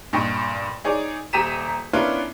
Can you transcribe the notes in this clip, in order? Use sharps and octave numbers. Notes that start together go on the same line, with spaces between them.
G2 A#2 D#5 G5 C#6
D#4 G#4 C#5 D5
D#1 G4 A#5 B6 D#7 E7
B3 C#4 D4 E4 F4 A#4